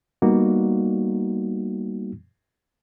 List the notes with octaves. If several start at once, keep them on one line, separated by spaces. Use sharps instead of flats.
G3 A#3 B3 D#4 F#4